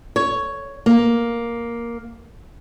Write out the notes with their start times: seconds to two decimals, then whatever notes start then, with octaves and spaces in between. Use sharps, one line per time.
0.16 C#5
0.86 A#3